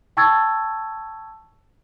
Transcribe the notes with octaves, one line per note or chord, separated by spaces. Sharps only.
G5 A5 C#6 E6 G#6 A6